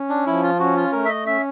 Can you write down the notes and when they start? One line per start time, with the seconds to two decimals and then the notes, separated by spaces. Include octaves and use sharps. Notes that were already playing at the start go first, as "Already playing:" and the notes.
Already playing: C#4
0.09 D4
0.26 F3 E4
0.43 F4
0.59 C#4 F#4
0.76 F4
0.92 A3 A#4
1.05 E5
1.09 D#5
1.26 C#4 E5